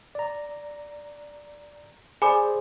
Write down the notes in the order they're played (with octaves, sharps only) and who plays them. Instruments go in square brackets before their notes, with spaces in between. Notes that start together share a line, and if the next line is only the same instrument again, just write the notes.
[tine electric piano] D5 A#5
[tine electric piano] G#4 C5 D5 [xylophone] G#5 B5 D6